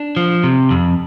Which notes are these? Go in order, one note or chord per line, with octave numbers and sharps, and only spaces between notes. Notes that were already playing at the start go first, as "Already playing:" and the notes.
Already playing: D4
F3
C3
F2